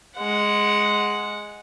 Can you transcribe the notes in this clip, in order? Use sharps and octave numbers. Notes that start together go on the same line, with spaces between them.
G#3 F#5